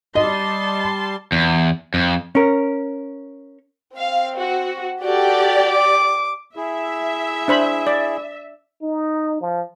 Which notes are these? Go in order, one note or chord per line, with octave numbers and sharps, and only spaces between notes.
G3 D#5 A5 C6
E2
F2
C#4 A#4
C4 F5
F#4
F#4 G4 A4 D5
D6
E4 G#4 E5
D4 C5 B5
D5
D#4
F3